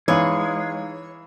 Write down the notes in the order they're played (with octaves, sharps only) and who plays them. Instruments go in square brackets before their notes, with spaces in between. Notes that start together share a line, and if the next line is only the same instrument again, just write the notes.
[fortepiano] E3 [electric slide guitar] G#3 [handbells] D#4 F5 [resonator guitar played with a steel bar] C#5